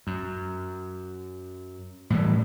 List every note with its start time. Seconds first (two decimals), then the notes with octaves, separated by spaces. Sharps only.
0.07 F#2
2.10 A2 E3 G3